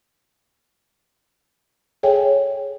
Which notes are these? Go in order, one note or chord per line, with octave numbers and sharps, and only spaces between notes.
G#4 A4 C#5 E5 G5 G#5